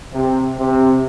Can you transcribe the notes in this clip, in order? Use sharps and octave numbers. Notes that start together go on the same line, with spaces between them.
C3
C3